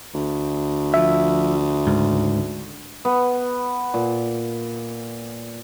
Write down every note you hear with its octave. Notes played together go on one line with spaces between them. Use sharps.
D2
F3 E5
C#2 G#2
B3
A#2